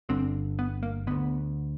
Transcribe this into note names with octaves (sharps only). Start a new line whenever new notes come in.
G1 G2 D3 C4
B3
A#3
D2 D3 B3